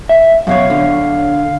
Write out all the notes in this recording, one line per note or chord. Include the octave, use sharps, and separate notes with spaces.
E5
F#2 B2 C#5 F5
D3